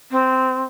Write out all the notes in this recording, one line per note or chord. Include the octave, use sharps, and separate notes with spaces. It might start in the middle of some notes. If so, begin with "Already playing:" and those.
C4